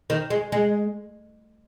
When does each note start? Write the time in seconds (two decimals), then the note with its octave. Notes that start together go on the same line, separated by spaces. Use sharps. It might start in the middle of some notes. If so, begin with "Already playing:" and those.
0.10 D#3
0.30 G#3
0.52 G#3